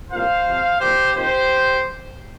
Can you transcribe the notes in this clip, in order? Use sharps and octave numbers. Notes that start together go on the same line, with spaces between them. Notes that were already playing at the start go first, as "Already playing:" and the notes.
C2 A#2 A#3 F4 C5 F5
C3 F3 C4
C2 A#2 F3 G4 C5
D#2 D#3 C4 F4 G4 C5